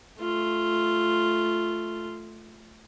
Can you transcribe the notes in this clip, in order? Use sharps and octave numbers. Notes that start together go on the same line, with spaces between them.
A3 F4